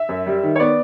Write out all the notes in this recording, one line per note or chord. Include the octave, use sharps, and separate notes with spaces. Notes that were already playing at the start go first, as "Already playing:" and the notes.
Already playing: E5
F#2
G3
D#3
C#5
B3 D5